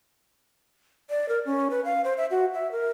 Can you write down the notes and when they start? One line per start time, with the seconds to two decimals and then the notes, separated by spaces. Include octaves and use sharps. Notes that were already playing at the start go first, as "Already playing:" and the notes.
1.10 D5
1.29 A#4
1.46 C#4
1.70 B4
1.85 F5
2.04 C5
2.17 E5
2.31 F#4
2.54 E5
2.72 A#4